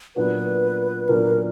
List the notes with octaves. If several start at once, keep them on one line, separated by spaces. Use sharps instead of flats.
A#2 F#3 B3 D4 F#4 B4
A#2 F#3 B3 D4 F#4 A#4